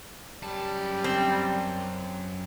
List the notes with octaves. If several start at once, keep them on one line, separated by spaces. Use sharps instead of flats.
F#2 G3 A5
C4